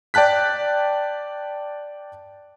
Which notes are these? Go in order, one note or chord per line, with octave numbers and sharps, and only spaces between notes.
D5 G5 A5 F#6 B6